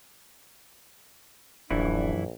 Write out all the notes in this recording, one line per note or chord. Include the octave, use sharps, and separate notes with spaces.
D1 A#1 F#2 E3 D4 E4